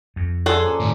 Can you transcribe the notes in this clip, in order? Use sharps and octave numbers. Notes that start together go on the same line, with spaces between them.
F2
D3 G#4 A4 F#5 G#5 C6
F3 A#3 C#4
A2 D#3